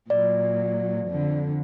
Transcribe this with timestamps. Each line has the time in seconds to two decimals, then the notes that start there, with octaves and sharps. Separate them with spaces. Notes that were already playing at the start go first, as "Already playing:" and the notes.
0.10 A#2 F#3 D5
1.07 F2 D3